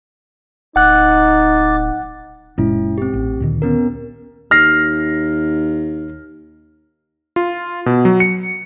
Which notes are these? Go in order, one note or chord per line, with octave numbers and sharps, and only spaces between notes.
D1 D#4 F#5 D6 F#6 A6
F#1 A#2 G#3 C#4 E4
C4 G4
A1
D2 A#2 D#3
B3 C#4 A#4
D#2 F6 A#6 C7
F4
B2
F#3
C#7